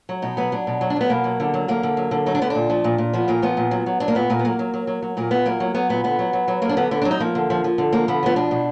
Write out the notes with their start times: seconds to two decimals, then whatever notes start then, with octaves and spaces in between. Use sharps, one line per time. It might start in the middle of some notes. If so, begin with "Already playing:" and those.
0.09 F#3
0.22 B2 D#4
0.37 F#3 B3
0.52 F#3 D4
0.67 B2
0.81 F#3
0.90 D4
0.96 F#3 B3
1.10 B2 A#3
1.24 F#3
1.40 D3
1.54 F#3
1.68 D3 A#3
1.83 D3
1.97 F#3
2.11 D3
2.26 F#3 D#4
2.35 D4
2.41 D3 B3
2.50 A#2 D4
2.70 F3
2.84 A#2
2.98 A#2
3.13 F3 B3
3.28 A#2 A#3
3.42 F3 B3
3.57 A#2
3.71 F#3
3.86 F#3
4.00 F#3 D4
4.08 A#3
4.15 A#2 B3
4.30 A#2 A#3
4.39 B3
4.45 F#3 A#3
4.59 F#3
4.74 F#3
4.87 F#3
5.02 F#3
5.17 A#2 A#3
5.31 A#2 B3
5.45 F#3 A#3
5.60 F#3
5.74 F#3 B3
5.89 A#2 B3
6.04 D3 B3
6.19 F#3
6.33 F#3
6.48 F#3
6.62 F#3 A#3
6.69 D4
6.77 D3 B3
6.91 D3 B3
7.02 F#3 D4
7.11 D#4
7.20 F3 A#3
7.35 D3
7.50 F3
7.64 F3
7.78 D3
7.93 F3 A#3
8.08 D3 B3
8.23 F3 B3
8.36 B2 D4
8.51 B2